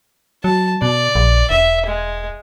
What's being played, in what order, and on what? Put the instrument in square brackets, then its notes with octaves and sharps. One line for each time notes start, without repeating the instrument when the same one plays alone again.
[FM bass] F#3 [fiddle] A5
[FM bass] B2 [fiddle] D5
[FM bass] A#1
[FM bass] E1 [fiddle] E5
[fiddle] G#3